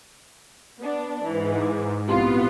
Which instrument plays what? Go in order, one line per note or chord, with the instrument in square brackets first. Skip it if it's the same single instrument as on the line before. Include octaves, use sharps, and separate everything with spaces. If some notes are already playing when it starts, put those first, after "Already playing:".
[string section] B3 D4
[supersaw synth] G#2 [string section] E3
[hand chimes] D6
[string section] A#1 F4 [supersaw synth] B3 [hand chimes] C4 E4 G4